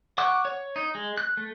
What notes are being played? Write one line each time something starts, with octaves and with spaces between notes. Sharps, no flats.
F#5 C#6 D6 E6 F#6
C#5
D#4
G#3
F#6
A3